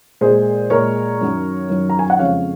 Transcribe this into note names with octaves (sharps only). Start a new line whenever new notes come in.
A#2 G#3 G#4 C5
A#2 G#3 A#4 C#5
F#2 D#3 F#3
F#2 D#3 F#3
A#5
G#5
F#5
F2 C#3 F3 G#3 C#5 F5